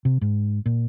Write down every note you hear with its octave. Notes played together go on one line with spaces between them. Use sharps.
C3
G#2
A#2